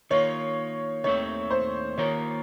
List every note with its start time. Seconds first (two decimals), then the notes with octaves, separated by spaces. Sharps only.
0.10 D#3 A#3 F4 C#5
1.04 D#2 D#3 A3 C4 C#5
1.51 C5
1.98 D#3 A#3 F4 A#4 C#5